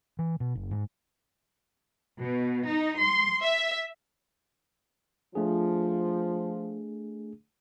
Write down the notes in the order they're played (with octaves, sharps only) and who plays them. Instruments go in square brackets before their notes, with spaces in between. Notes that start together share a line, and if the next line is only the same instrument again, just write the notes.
[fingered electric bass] E3
B2
F#1
G#2
[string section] B2
D#4
C6
E5
[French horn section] F3 [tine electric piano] A3 D4 G#4